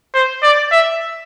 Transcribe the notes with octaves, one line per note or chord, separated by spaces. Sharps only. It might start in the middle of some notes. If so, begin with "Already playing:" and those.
C5
D5
E5